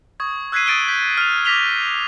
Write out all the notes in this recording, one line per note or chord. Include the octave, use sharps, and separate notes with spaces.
C#6 D#6 G#6
E6 F#6 G#6 B6 C7 D#7
D#6 A6 D7 D#7 G7
G6 B6
F6 F#6 D7 F7
D6 A#6 B6 F7 G7